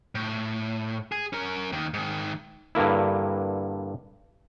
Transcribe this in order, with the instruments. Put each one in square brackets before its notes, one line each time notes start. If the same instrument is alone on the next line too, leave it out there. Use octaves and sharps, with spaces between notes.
[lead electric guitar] A2
G#4
C#4 A#4
D#2 D#3
G#2 D#3
[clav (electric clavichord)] G2 D3 A#3 E4